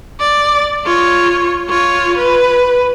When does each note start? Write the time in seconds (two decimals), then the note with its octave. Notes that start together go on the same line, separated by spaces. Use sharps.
0.20 D5
0.85 F4 C#5
1.69 F4 C#5
2.18 B4